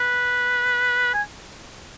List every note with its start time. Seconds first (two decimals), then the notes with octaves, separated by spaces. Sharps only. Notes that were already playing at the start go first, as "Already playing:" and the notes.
Already playing: B4
1.14 G#5